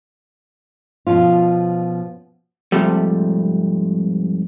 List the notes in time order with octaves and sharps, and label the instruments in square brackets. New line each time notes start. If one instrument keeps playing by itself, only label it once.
[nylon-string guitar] B2 F3 C#4 F4
[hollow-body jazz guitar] G#2 C3 F3 G3 A3